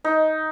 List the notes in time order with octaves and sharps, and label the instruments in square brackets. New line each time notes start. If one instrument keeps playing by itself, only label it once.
[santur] D#4